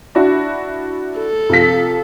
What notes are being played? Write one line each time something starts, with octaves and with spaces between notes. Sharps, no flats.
D4 E4 F#4
A4
C3 F3 B6